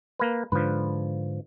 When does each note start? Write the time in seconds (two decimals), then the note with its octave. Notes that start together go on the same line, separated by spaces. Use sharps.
0.19 A#3 B4
0.52 G#2 D3 F3 B4